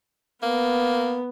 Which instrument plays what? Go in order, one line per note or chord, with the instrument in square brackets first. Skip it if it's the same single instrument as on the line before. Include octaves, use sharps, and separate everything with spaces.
[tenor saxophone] A#3 [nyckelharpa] B3